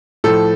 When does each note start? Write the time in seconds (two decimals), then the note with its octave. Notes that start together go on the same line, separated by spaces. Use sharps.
0.24 A2 F3 A4